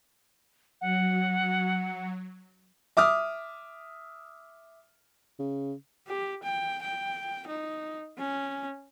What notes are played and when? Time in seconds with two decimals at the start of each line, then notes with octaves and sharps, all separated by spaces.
0.81 F#3 F#5
2.97 E5 D6 D#6 F6
5.39 C#3
6.07 G4
6.43 G5
6.82 G5
7.48 D#4
8.19 C#4